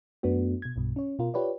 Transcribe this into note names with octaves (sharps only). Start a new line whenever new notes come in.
F#2 A3 B3 D4 F#4
B2 G#6
B1 G2 B2
C#4 C#5
B2 F4 A#4
F4 G4 B4 C#5 D5